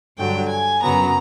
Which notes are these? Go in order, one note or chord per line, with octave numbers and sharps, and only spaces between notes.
G2 D3 F#3 G5
G#5
F#2 C#3 F#3 B3 A#5